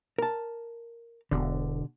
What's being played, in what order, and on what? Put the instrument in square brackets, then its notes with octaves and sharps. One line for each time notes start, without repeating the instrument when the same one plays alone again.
[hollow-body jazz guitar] A#4 A5
[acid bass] E1 [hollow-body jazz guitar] B2 D3